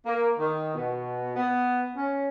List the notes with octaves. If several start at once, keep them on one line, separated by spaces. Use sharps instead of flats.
A#3
D#3
B2
B3
C#4